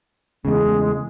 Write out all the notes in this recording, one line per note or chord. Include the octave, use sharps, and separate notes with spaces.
E2 C#3 G#3